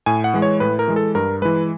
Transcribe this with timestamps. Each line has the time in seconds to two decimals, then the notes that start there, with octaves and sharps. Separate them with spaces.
0.06 A2 G#5
0.24 F#5
0.34 E3 G#3
0.42 C#5
0.60 A2 B4
0.79 A#4
0.88 E3 G#3
0.96 A4
1.15 G2 A#4
1.42 E3 G#3 B4